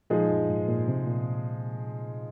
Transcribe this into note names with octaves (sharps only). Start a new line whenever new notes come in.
A#2 F3 G#3 D#4 G#4
F#2
G#2
A#2
C3
A#2